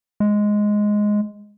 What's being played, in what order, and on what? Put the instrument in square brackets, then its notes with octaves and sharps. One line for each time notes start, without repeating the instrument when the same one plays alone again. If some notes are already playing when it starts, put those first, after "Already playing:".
[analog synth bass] G#3